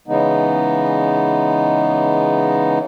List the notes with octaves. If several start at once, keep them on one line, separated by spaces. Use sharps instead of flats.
C#3 E3 G#3 B3 D#4